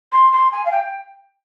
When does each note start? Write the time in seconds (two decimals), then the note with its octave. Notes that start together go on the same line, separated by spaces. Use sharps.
0.12 C6
0.32 C6
0.52 G#5
0.65 F5
0.71 G5